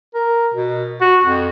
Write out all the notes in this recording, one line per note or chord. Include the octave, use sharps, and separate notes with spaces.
A#4
B2
F#4
F2